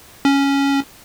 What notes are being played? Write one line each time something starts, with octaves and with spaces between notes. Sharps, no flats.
C#4